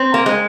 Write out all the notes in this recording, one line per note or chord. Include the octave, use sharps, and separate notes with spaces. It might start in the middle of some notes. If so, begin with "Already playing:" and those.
Already playing: C4
A#3
G#3